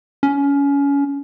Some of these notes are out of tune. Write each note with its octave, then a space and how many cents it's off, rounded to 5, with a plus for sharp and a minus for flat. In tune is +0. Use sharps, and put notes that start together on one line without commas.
C#4 +25